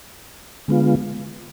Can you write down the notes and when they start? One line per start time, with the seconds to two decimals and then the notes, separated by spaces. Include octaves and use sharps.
0.68 D3 G#3 B3 F4